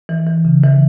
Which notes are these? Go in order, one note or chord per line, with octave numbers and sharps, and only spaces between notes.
E3
E3
C#3
E3